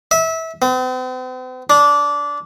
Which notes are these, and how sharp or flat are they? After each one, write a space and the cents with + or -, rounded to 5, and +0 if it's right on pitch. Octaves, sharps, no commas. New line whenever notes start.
E5 -25
C4 -45
D4 -15